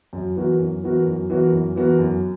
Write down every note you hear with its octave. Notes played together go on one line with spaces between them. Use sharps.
F#2
E3 B3 F#4 A#4
F#2
E3 B3 F#4 A#4
F#2
E3 B3 F#4 A#4
F#2
E3 B3 F#4 A#4
F#2